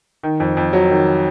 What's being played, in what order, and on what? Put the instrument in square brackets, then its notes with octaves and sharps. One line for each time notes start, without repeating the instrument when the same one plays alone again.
[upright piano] D#3
F2
F2
F#3
D#3